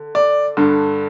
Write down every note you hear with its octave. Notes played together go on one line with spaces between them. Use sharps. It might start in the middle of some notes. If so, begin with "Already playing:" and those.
Already playing: D3
D5
G2 D3